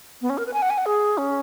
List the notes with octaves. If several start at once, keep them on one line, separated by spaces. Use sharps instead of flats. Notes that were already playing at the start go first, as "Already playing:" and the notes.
B3
C#4
A#4
B4
G#5
F#5
G#5
F#5
G#4
C#4